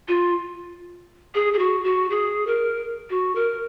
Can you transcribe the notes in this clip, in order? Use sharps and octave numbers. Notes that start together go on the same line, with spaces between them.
F4
G#4
G#4
F#4
F#4
G#4
A#4
F#4
A#4